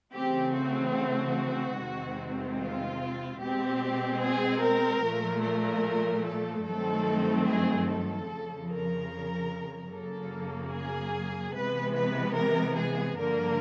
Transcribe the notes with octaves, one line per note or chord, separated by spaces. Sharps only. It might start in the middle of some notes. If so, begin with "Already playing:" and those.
C#3 E3 A3 C4 G4
F#4
F#4
E2 C3 D#3 G#3 C4
F4
B2 G#3 C4 G4
G#4
A#4
A#2 F3 A3
A#4
A4
G2 D#3 F#3 A3 C4 A4
G#4
A4
F2 C#3 F3
A#4
F#2 C#3 F#3 A#3 A4
G#4
C3 E3 G#3 B3 B4
B4
A#4
G#4
G2 D3 F3 A#3 A#4